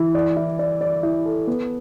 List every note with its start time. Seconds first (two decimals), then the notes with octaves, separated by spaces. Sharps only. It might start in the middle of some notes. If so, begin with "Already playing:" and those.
Already playing: E3
0.15 D5
0.36 E4
0.59 D5
0.81 D5
1.03 E4
1.25 A4
1.47 B3